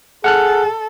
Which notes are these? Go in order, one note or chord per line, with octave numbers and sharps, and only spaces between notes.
G#4 A4 F#5 F6 F#6